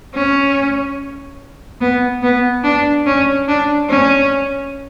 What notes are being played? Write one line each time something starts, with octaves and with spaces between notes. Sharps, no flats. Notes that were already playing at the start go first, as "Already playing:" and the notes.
C#4
B3
B3
D4
C#4
D4
C#4